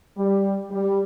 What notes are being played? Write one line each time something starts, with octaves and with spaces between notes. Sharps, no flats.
G3
G3